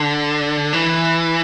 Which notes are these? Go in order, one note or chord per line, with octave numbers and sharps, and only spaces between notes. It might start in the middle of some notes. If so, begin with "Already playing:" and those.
Already playing: D3
E3